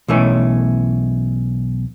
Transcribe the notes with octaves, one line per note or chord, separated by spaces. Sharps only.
B1 E3 A3 C#4